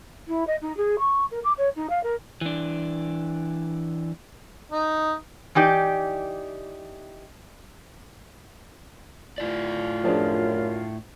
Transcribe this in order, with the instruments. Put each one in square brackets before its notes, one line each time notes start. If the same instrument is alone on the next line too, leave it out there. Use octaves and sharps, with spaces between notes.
[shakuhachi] E4
D#5
D#4
G#4
C#6
A#4
D6
C#5
D#4
F5
A#4
[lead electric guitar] E3 D4
[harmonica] D#4
[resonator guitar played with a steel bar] E3 D#4 G4 D5
[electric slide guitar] A2 E4 D5 [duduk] F4
[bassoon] F#2 [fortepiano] F3 D4 G#4